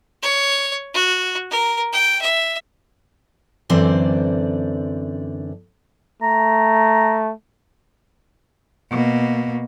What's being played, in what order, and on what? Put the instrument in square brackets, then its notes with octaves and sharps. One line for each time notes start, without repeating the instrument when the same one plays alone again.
[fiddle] C#5
F#4
A#4
G5
E5
[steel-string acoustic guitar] F#2 D3 E3 C4 C5 D5
[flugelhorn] A3 [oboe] A#5
[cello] B2 A#3